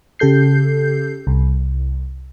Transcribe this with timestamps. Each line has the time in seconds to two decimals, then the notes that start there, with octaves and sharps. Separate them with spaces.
0.19 C#3 G4 A4 G6 C7
1.27 C2